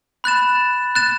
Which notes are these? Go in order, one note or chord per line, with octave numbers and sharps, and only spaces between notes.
B5 F#6 A6 E7
F#6 A6 E7